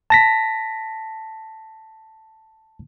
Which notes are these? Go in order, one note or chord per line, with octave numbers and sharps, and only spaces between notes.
A5 A#6 B6